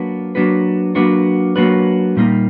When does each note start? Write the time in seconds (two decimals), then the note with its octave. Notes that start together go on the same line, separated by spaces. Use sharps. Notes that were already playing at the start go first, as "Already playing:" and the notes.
Already playing: F#3 A#3 D4 F#4 B4
0.35 F#3 A#3 D4 F#4 B4
0.95 F#3 A#3 D4 F#4 B4
1.56 F#3 A#3 D4 F#4 B4
2.17 A#2 G3 A#3 D#4